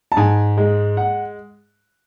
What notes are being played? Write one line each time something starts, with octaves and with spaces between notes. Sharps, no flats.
A5
G#2 G#5
G#3
F#5